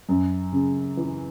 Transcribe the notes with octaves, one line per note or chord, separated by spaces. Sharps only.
F#2
C#3
E3